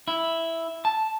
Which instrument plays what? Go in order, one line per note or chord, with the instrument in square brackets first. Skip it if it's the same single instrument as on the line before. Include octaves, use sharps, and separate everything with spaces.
[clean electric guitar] E4
A5